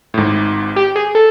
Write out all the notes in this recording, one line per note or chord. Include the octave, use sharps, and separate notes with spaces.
A2
G#1 G#2
G4
G#4
A4